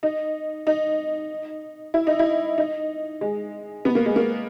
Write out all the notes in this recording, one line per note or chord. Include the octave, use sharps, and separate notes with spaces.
D#4
D#4
E4
D#4
E4
D#4
G#3
B3
A#3
G#3
A#3